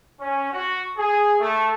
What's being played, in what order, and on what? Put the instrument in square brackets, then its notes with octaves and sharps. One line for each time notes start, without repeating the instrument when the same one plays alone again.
[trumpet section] C#4
F#4
G#4
A3